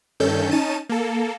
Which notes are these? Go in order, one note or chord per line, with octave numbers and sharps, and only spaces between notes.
G2 D#3 C#4 A4 G6
C#4 D#4 A5 D#7
A#3 A4